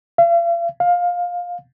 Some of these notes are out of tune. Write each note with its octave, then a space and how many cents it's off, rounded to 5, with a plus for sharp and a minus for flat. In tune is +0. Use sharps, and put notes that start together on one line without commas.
F5 -45
F5 +15